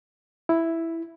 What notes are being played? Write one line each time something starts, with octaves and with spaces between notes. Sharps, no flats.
E4